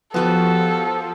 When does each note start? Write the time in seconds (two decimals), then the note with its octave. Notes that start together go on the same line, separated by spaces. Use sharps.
0.14 F3 B3 F#4 G4 A4